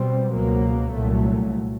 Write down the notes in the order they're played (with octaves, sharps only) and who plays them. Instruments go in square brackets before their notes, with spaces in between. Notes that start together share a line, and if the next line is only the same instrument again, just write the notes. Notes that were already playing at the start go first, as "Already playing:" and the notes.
Already playing: [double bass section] B2 G3 C4
C#2 B2 F#3 A#3
C2 A#2 F#3 A3